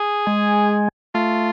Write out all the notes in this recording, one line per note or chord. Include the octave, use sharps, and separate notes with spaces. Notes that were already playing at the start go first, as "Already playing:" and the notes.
Already playing: G#4
G#3
A3 F4